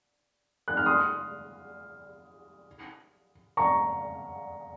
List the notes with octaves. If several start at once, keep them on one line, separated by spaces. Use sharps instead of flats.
F#6
F6
C6 D#6
A#5 C#6